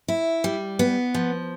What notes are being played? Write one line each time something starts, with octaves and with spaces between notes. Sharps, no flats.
E4
G3
B3
F3